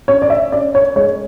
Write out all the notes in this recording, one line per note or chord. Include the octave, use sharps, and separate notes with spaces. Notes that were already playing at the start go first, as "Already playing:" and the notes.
C#4 C#5
D5
E5
C#4 D5
C#5
G#3 C#5